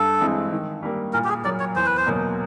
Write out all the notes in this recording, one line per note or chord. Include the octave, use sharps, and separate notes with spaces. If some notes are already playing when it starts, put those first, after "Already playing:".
Already playing: G2 A4
E3 G#3 C4 E4
D#3
G3 A#3
A#2 A#4
G4
G#4
F#3 A#3 D5
C#5
E2 C5
B4
C5
B2 F#3 A#3